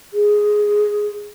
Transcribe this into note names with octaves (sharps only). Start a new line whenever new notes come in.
G#4